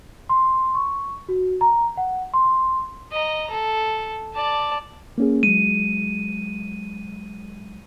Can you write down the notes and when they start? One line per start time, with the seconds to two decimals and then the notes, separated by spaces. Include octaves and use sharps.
0.29 C6
0.75 C#6
1.29 F#4
1.61 A#5
1.97 F#5
2.34 C6
3.12 D#5 A#5
3.50 A4
4.34 D5 A5
5.18 A#3 C#4 G#4
5.43 F#3 G#3 D#7